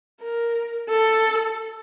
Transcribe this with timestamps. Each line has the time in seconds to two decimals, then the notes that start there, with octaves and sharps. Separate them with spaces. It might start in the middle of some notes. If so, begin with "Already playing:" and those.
0.21 A#4
0.89 A4